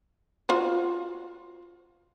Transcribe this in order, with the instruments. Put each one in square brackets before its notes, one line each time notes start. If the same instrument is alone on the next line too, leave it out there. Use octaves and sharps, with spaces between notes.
[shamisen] F4 F#4 C5